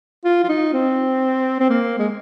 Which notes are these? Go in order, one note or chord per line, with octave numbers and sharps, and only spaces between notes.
F4
F4
D#4
C4
C4
A#3
G#3